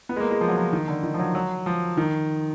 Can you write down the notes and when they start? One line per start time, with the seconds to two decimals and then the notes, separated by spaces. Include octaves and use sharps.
0.09 B3
0.16 G#3
0.20 A#3
0.31 G#3
0.41 F3
0.49 F#3
0.57 F3
0.73 D#3
0.88 D3
1.03 D#3
1.14 F3
1.19 F#3
1.35 F#3
1.66 F3
1.97 D#3